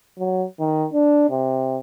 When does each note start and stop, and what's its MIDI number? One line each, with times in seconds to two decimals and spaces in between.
0.19 0.45 54
0.60 0.86 51
0.93 1.27 62
1.30 1.77 48